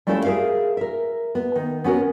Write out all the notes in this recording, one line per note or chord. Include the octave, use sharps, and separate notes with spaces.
G3 A3 C#4 E4 F4 A4
G#4 A#4 C#5 E5 F5
A#4 E5
B3
D#3
B3 C#4 F#4 A#4